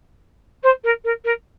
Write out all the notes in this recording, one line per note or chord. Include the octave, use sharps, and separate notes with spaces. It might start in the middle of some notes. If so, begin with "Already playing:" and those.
C5
A#4
A#4
A#4